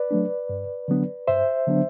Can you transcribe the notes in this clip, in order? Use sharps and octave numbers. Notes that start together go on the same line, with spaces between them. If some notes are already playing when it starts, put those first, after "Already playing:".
Already playing: B4 D5
F#3 A3 D4
G2
D3 F#3 B3 D4
G2 C5 E5
D3 F#3 B3 D4